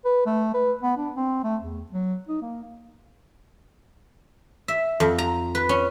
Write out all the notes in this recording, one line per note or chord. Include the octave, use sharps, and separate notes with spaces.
B4
A3
B4
B3
D4
C4
A3
E2
F#3
D#4
A#3
E5
F2
A#5
B4
C#4